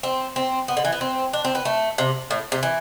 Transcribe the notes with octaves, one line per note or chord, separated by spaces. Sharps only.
C4
C4
B3
D3
E3
B3
C4
D4
C4
B3
A3
C3
A2
C3
E3